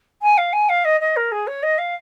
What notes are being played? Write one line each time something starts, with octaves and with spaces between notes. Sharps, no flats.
G#5
F5
G#5
F5
D#5
D#5
A#4
G#4
C#5
D#5
F5